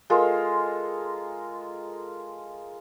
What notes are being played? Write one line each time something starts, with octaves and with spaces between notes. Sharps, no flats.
G#3 F4 A4 A#4